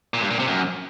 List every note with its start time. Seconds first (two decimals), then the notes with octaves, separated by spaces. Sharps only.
0.14 A#2
0.22 G2
0.31 A#2
0.39 C3
0.47 F#2